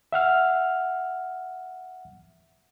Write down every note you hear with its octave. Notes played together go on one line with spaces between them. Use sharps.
E5 F#5 F6